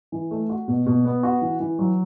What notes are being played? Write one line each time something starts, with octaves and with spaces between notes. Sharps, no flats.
E3
A3
F#4
B2
B2
B3
F#4
E3
E3
F#3